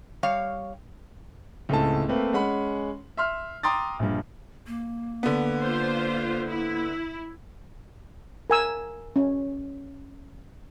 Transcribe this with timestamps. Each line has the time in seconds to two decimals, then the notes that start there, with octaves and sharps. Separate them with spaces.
0.23 G3 C#5 F5
1.69 C#2 A2 C4 A4 A5
2.08 A3 A#3 C4 B4
2.33 G#3 C#4 F#5 B5
3.17 E5 C6 F6
3.63 G5 A#5 C6 D6 D#6 A6
3.99 A#1 G2
4.67 A#3
5.23 D3 B3
5.62 F4 C5
6.47 E4
8.50 A#4 G#5 E6
9.16 C#4